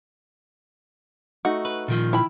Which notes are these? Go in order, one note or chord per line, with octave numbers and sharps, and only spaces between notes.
A3 D#4 F#4
B4
A#2 D#3 F3
E4 G5 B5